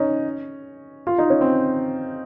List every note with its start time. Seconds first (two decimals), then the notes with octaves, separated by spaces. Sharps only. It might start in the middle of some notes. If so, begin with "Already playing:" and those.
Already playing: C#4 D#4
1.07 F4
1.18 D#4
1.30 C#4
1.41 C4